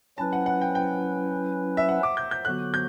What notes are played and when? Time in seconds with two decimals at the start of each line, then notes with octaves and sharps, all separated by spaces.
0.18 F#3 C#4 E4 B4 A5
0.33 F#5
0.46 F#5
0.61 G5
0.75 G5
1.77 E5
1.89 F#5
2.03 D6
2.17 G6
2.31 G6
2.45 D3 F#3 B3 F#4 F#6
2.74 G6